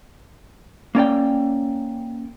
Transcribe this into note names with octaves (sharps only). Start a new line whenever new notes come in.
A#3 C#4 D5 G5